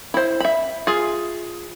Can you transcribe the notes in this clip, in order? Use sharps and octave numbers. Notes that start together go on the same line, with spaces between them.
E4 C5
E5 B5
F4 G#4